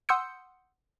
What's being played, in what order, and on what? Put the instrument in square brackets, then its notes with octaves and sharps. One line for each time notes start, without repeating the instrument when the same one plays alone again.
[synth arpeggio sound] F#5 C6 D#6 E6 G6 C#7